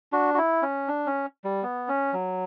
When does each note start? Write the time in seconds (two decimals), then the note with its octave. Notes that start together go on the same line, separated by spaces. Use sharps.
0.13 D4 F#4
0.34 F#4
0.38 E4
0.62 C#4
0.88 D4
1.06 C#4
1.44 G3
1.63 B3
1.88 C#4
2.13 F#3